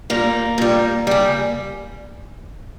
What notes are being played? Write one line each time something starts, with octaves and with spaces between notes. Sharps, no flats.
A#2 G3 A#3
A#2 G3
C#3 G3